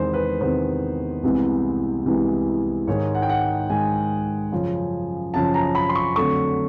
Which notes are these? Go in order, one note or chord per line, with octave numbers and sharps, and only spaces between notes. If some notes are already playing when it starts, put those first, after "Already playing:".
Already playing: E2 C3 D#3 G#3 B3 C5
B4
E2 C3 D#3 G#3 B3 C5
C2 C3 E3 G#3 B3
C2 C3 E3 G#3 B3
G#2 D#3 G#3 C#5
F#5
G5
F#5
G#2 D#3 G#3 G#5
F#2 C#3 F3
F#2 C#3 F3 A5
A#5
B5
C6
C#6
F2 D3 F#3 A3 C#6